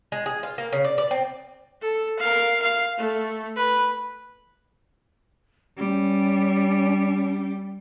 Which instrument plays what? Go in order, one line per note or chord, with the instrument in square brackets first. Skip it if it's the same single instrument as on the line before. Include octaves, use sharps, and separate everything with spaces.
[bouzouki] G#3
G#4
F4
A#3
C#3
D5
D5
C4
[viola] A4
A#4 F5
F5
A3
B4
[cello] G3 [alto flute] C#4